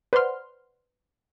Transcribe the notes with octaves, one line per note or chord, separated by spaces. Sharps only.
B4 C5 D5 F#5 C6 F6